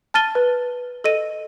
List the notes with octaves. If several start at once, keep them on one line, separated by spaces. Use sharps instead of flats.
A5 F6 A6 D#7 G7
B4
A4 D#5 D#7